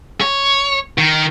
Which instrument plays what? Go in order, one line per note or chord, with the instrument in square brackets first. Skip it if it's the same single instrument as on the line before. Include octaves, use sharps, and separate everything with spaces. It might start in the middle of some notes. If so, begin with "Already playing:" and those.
[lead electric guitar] C#5
D#3